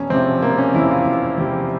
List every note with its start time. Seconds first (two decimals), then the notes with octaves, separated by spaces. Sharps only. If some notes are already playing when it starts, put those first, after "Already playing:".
Already playing: E1 C#4
0.10 E2 C3 F3 C4
0.42 E1 A#3
0.58 C#4
0.74 E2 C3 F3 E4
0.91 F4
1.07 E1
1.38 E2 C3 F3 G4